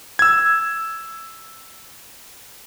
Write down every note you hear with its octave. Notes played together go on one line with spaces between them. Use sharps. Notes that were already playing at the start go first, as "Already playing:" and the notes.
E6 G#6